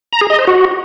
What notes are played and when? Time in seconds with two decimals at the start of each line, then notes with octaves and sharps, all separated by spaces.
0.13 A#5
0.21 G#4
0.30 D#5
0.39 C5
0.47 F#4